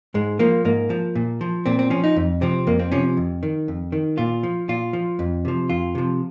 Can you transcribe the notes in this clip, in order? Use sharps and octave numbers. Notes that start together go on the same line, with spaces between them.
G#2 G#3
F3 A#3
G#2 A#3
F3
A#2
F3
A#2 C4
C4
F3 C#4
D#4
F2
C3 F3 C4
F2 A#3
C4
C3 F3 C#4
F2
D#3
F2
D#3
A#2 F4
F3
A#2 F4
F3
F2
C3 F3
F2 F4
C3 F3